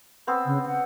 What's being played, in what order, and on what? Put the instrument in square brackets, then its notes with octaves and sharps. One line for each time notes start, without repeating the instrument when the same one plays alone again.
[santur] B3 C4 E6
[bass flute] C#3
F#5